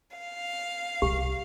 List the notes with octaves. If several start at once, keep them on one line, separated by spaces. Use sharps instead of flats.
F5
C2 G4